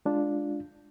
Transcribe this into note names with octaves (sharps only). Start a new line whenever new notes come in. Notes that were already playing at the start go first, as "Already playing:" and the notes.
G#3 D4 F4